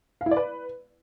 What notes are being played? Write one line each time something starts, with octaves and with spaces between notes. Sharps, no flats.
F5
E4
D5
B4